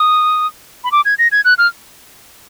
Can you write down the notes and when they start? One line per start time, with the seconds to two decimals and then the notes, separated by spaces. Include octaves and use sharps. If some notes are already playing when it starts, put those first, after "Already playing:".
Already playing: D#6
0.84 B5
0.92 D6
1.05 G#6
1.18 A#6
1.32 G#6
1.45 F#6
1.58 F6